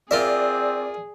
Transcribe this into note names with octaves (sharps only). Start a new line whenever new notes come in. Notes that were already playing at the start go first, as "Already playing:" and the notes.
C4 F4 G#4 A#4 D5 E5